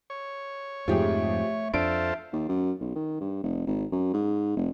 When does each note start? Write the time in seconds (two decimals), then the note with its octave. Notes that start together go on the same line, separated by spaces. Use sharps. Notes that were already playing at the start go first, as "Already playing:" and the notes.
0.10 C#5
0.88 F2 G#2 C3 F3 A3 G4 G#4
1.74 F2 D4 F4 A4 C5 E5 D7
2.33 D#2
2.49 F#2
2.81 B1
2.95 D#3
3.20 G2
3.43 F1
3.67 G#1
3.92 F#2
4.14 G#2
4.56 F1